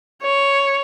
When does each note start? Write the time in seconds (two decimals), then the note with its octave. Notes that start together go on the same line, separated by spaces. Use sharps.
0.23 C#5